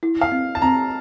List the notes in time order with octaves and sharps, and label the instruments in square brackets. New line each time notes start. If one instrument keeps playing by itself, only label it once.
[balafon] E4
[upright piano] F5
[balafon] C4
[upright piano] A5
[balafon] C4 [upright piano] A#5